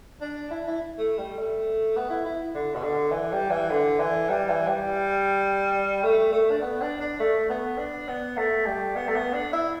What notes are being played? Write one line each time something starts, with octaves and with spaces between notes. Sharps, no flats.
D4
E4
E4
A3
G3
A3
B3
E4
E4
D3
B2
D3
E3
G3
E3
D3
E3
G3
E3
G3
A3
A3
D4
B3
D4
D4
A3
B3
D4
B3
A3
G3
B3
A3
B3
D4
E4